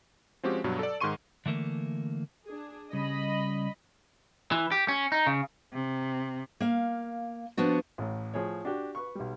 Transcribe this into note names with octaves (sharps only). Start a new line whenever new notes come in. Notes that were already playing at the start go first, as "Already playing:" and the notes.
F3 G#3 C4 C#4 F#4 G4
G2 B2 F#3
A4 D5
G#2 D#3 G#4 C6 C#6 D#7
D3 E3 A3 A#3
D4 G#4
C#3 G3 D#5 B5
E3
G4
C#4
D#4
C#3
C3
A#3 F5
F3 B3 D4 F#4
A1 A2
A2 F3 G#4 C#5
D4 F#4 G4
B4 C#6
B1 G3